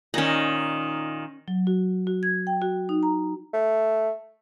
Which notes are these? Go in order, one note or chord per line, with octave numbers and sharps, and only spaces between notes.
A#2 D#3 C#4 D#5
F#3
F#4
F#4
G#6
G5
F#4
D#4
A#5
A3